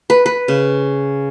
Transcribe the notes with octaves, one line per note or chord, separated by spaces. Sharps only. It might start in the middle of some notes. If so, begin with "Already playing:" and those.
B4
B4
C#3